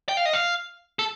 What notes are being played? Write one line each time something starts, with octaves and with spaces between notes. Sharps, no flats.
G5
F5
D#5
F5
A4